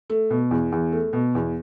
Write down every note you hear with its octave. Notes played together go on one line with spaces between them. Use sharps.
A3
B2
E2
E2
A3
B2
E2